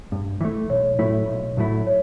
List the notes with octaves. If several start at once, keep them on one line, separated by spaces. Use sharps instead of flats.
G2
E3 A3
B1 C#5
A2 F#3 A3 E4
B1
A2 F#3 A3 E4
C#5